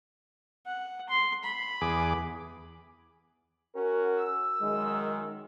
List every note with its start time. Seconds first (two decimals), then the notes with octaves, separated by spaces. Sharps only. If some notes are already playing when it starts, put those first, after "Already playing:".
0.66 F#5
1.09 C6
1.44 B5
1.81 E2 G#4 D6
3.74 C#4 F#4 A#4
4.18 E6
4.61 F#2 D#3 G#3